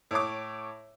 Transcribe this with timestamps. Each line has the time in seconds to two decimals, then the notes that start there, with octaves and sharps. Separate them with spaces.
0.11 A2 C#5 D6